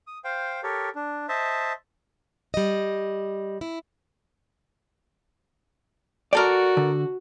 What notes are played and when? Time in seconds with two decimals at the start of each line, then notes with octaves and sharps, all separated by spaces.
0.07 D#6
0.24 C5 F5 G5
0.63 G4 A4 A#4 C#5
0.95 D4
1.29 C5 D#5 E5 A5
2.54 G3 D#5
3.61 E4
6.33 F#4 G4 A4 A#4 D5
6.77 D3